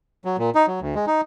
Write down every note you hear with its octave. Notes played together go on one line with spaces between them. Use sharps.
F#3
A#2
D#4
F#3
D2
G#3
D#4